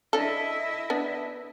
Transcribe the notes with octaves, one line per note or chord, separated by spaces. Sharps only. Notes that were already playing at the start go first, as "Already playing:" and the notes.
D4 E4 A4 D#5 E5
B3 D4